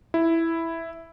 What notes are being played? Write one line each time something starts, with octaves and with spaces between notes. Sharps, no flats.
E4